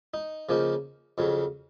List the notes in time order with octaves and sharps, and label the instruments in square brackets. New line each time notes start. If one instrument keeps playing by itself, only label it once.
[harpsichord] D#4
C#3 F3 A#3 D#4
F2 C#3 F#3